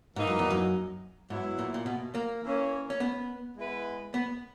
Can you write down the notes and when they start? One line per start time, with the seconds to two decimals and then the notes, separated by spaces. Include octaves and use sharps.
0.16 G#2 E3 A#3 D#4
0.27 F#2
0.39 E2
0.50 F#2
1.29 G#2 F#3 B3 E4
1.59 A#2
1.74 A#2
1.86 B2
2.15 A#3
2.43 E3 A#3 C#4
2.90 C#4
3.00 B3
3.56 G#3 B3 E4 B4
4.14 B3